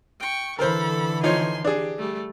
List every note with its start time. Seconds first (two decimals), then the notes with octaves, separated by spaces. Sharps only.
0.20 G5 C#6
0.59 D3 E3 A4 A#4 C5 B5
1.23 F3 D#4 C#5 G#5 C6
1.65 D4 G4 G#4
1.98 G3 A3